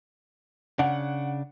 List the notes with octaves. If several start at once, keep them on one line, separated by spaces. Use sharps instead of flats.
C#3 D4 F#5